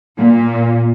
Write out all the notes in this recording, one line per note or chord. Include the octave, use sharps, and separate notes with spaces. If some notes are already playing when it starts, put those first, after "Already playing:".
A#2